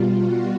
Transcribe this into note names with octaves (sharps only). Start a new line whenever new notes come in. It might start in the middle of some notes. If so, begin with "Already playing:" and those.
Already playing: B2 G3 F4
F#4